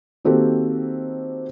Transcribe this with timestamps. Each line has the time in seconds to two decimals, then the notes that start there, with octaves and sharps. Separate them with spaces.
0.25 D#3 A#3 C4 F#4 G4 A4